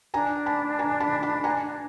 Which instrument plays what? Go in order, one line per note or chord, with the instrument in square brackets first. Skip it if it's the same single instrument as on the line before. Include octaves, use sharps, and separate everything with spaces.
[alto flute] D4 [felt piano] G#5 A#5
[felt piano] A5 B5
G#5 A#5
A5 B5
A5 B5
G#5 A#5